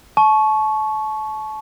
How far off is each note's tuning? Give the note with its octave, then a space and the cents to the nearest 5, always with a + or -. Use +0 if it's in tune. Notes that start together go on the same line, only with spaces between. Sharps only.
A5 -35 C#6 +0